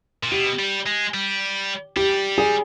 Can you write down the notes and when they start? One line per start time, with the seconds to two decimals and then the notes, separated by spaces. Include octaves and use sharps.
0.23 A#2
0.31 B2 G4
0.59 G3
0.86 G#3
1.14 G3
1.96 G3 G4
2.38 G#4